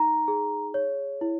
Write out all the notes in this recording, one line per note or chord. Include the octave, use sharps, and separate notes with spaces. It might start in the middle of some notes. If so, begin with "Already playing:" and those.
Already playing: D#4 A#5
G#4
C#5
E4